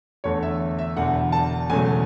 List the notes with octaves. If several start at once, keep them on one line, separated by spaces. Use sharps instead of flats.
E2 D3 A3 C#5
E5
E5
E1 E2 D3 F#5
A5
E1 E2 C#3 F#3 A3 G#5